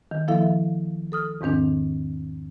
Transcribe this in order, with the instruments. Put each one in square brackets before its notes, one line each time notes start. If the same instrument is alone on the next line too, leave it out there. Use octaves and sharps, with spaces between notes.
[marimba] D#3
F3 A#3 E4 A4 E5 F5
A4 D#6 F6
E2 G#2 D#3 C4 D4